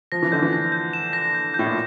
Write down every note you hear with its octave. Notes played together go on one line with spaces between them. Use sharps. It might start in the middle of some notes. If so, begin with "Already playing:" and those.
F3 A#6
E3
D3 G6
E3
A#6
G6
E7
A#6
G6
A2 G6
A#2